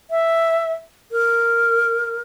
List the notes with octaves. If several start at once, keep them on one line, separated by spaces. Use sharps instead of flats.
E5
A#4